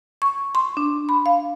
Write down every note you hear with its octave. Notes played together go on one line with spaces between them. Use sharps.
C#6
C6
D4
B5
F5